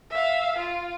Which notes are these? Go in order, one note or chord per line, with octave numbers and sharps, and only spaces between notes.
E5 F5
F4